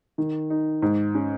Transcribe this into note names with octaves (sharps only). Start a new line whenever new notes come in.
D#3
D#4
G#2
C#4